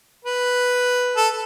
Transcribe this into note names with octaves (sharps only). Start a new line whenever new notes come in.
B4
A4